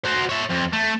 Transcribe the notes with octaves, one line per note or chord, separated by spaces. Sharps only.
F#4 C5
C#5 E5
F2
A3